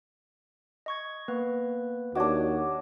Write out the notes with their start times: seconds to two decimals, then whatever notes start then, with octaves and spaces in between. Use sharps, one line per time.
0.86 D#5 C#6 G#6
1.28 A#3 B3 B4
2.15 D#2 D4 F#4 C#5 D#5 D6